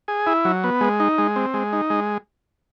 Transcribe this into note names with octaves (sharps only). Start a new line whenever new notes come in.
G#4
E4
F#3
B3
G#3
D#4
G#3
C4
G#3
D#4
G#3